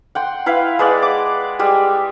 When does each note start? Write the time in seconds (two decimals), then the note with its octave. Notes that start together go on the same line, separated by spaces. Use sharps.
0.15 F#5 G5 C6
0.46 E4 B4 F5
0.79 G#3 B4 D5 F#5
1.02 D6
1.59 G3 G#3